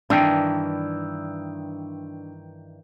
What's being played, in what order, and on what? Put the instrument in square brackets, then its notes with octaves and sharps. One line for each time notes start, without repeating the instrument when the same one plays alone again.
[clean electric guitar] G2 D#3 E3 [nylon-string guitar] D4 [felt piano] G5